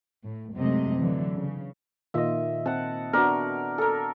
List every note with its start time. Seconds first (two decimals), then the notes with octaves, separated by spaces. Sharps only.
0.25 A2
0.56 F#2 C3 G#3 A3 D#5
0.98 D3 E3 F#3
1.36 C#3
2.14 A#2 D#3 F4 D#5 E5
2.66 C4 F#5 A5
3.13 B3 D4 F#4 A#4 D5
3.78 A4 A#4